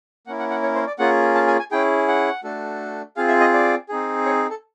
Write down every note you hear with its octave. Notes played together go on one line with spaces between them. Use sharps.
A#3 C#4 E4 F#5
F#5
F#5
C#5
C5
D5
A#3 C#4 F4 G#4 F#5
A5
G#5
G#5
C#4 E4 G#4 G5
F#5
A3 D4 F#4 A4
C4 F4 G#4 F5
E5
D#5
D5
C4 D#4 G#4
C#5
A4